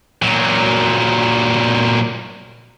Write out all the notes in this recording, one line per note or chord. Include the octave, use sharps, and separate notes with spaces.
A#2 F#3